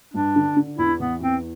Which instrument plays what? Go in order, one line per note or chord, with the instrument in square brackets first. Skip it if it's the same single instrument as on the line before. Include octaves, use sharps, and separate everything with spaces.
[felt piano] G2 [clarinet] D4
[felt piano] D3
D3
[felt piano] E2 [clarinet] E4
[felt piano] E3 [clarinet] B3
[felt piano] E2 [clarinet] C4